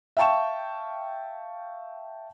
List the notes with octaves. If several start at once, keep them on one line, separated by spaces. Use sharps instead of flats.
E5 F5 G5 A5 C#6 E7